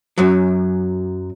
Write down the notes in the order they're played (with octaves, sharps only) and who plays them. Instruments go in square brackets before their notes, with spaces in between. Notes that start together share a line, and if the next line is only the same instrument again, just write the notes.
[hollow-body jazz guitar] F#2 F#3